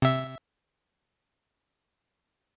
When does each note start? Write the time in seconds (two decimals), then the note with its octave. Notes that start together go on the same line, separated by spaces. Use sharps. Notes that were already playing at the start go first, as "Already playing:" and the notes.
0.02 C3 E5